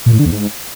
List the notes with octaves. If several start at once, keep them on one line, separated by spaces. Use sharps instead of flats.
A#2
A2
D3
E2
G#2